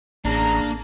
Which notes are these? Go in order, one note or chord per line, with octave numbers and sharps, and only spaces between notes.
A1 C#3 A#3 D4 A#5